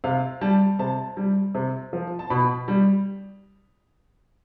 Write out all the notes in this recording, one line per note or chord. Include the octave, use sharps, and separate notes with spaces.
C3 F5
G3 A5
C3 A5
G3
C3
F3
A5
B2 B5
G3